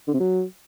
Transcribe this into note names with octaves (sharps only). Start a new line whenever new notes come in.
D3
C3
F#3